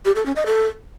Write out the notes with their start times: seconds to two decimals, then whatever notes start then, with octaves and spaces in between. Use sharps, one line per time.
0.05 G4
0.16 A4
0.26 C#4
0.36 D#5
0.46 A4